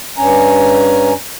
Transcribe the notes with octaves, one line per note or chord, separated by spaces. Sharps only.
G2 C#4 G#5 A#5